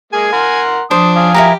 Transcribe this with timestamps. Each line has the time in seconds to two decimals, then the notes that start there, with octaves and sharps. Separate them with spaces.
0.13 G#3 A#3 G#4 G#5
0.33 A#4 F#5 C6
0.91 F3 D4 C5 D#6
1.16 F5 G#5 D#6
1.34 E4 G4 A#4 A#5